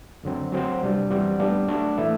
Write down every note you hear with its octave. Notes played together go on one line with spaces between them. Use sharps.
F#2 D3 F#3 C4
F#3 C4 F#4 C5
C3 G3 D4
F#2 E3 G3 C4 F#4
A2 G3 B3 D4
F#3 A3 D4 F#4
A2 E3 A3 E4 A4